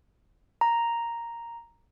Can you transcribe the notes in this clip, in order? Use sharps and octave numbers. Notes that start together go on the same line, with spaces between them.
A#5